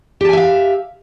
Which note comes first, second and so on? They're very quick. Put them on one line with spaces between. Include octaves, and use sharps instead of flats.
G4 A5 G#5 E5 F5